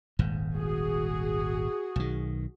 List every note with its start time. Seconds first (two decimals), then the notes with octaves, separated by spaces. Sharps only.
0.19 D#1 G#1 G#2
0.55 F#4 G#4
1.96 B1 D#3